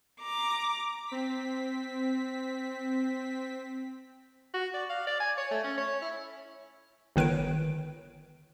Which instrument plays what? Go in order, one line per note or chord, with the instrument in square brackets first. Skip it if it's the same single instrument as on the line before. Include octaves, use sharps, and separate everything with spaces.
[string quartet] A#5 D6
[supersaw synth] C4 B6
[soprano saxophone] F#4
D5
F5
D5
G#5
C#5
A3
C#4
C#5
E4
[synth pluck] G1 D#3 B4 C#5 D7